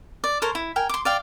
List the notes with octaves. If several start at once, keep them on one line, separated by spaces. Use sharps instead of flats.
D5
A4 A#4 C5 C#5
E4
A#4 G5 G#5
C6 D6
D5 F5 G5